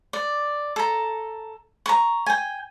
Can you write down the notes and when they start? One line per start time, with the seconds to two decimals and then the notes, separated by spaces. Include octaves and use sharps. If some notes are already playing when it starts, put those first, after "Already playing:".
0.13 D5
0.76 A4 A#5
1.86 A#5 C#6
2.26 G5 G#5